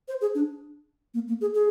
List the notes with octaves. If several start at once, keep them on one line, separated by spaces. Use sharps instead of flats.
C5
G#4
D4
A#3
A#3
G#4
G#4